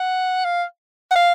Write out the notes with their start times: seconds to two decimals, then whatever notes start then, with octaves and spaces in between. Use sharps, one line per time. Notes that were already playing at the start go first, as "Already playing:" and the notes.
Already playing: F#5
0.45 F5
1.11 F#5
1.16 F5